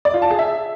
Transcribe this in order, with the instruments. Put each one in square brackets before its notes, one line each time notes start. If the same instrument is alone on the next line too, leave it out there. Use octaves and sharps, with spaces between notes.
[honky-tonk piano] D5
F4
A5
G#4
E5